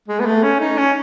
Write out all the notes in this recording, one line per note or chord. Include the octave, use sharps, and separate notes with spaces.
G#3
B3
A3
C#4
D#4
C#4